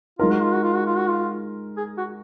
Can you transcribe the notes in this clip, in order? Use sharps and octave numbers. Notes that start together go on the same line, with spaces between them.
G#3 D#4 F4 A#4
F#4
F4
F#4
F4
F#4
F4
F#4
F4
G#4
F#4